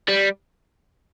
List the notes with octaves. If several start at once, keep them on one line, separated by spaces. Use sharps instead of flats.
G3